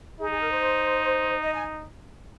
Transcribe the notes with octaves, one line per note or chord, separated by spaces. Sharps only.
D#4 G#4
G#4
A#4
C5
D#5
G#5